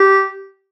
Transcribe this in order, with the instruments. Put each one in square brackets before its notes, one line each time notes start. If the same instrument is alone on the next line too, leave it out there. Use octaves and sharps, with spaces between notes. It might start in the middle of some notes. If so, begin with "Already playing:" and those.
Already playing: [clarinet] G4